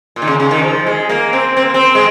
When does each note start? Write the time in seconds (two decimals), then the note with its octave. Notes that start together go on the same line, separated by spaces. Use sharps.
0.16 A#2
0.22 D#3
0.28 C#3
0.40 C#3
0.51 D#3
0.63 F3
0.87 G#3
1.09 A#3
1.33 C4
1.57 C4
1.65 A#3
1.74 C4
1.95 G#3